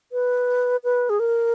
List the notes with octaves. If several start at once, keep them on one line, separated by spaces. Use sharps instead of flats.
B4
B4
G#4
A#4